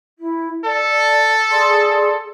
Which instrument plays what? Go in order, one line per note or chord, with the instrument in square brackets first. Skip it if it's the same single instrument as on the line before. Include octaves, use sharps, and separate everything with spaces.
[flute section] E4
[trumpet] A4 [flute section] D5
[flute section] G#4 D5 C6